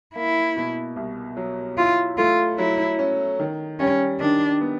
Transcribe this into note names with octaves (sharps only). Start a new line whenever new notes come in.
A#3 E4
B2
C2
F#3
E4 F4
A3 F4
F#3 E4
C#4
D#3
G3 C#4
D#3 D4
B3